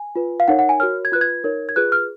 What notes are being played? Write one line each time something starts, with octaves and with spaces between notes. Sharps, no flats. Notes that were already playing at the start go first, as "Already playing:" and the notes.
Already playing: G#5
F4 B4
F5
D#4 A#4 C#5 F#5
F#5
G#5
F#4 A#4 C#5 F6
G#6
F4 B4 F#6
G#6
D#4 A#4 C#5
G#6
F4 G#4 B4 F#6
F6